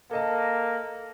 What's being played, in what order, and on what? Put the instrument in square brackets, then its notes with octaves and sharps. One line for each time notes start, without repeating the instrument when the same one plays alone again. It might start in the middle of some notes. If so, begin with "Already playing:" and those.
[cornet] A#3 [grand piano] A4 D#5 A5